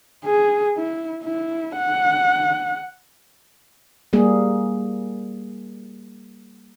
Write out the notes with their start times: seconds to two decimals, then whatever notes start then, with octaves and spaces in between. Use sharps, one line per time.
0.25 G#4
0.77 E4
1.24 E4
1.76 F#5
4.13 G3 A#3 G#4